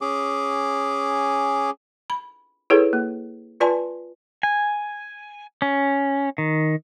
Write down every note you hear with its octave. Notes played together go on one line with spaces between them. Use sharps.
C#4 G#4 D6
B5
E4 G#4 A4 B4 C#5
A#3
F4 B4 D5 G#5 A5 C6
G#5
C#4
D#3